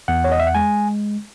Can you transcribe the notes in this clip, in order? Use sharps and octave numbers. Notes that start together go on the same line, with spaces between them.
E2 F#5
C#5
D#5
E5
F#5
G#3 G#5